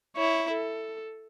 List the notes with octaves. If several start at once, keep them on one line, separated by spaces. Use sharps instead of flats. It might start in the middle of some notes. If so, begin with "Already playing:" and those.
E4 C#5
A4